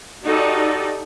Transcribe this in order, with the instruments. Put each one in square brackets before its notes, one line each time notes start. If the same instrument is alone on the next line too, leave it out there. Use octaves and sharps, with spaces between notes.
[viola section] D#4 F#4 G4 A4 D5